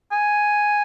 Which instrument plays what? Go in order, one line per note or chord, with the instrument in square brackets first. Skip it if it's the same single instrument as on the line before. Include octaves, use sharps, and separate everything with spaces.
[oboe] G#5